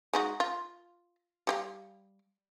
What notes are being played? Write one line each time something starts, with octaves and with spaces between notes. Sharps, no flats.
G#3 D#4 F#4
F4
G3 G4 F5